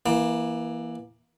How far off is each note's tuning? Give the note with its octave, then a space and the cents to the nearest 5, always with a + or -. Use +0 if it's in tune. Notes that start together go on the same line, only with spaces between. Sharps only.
E3 +0 A#3 +25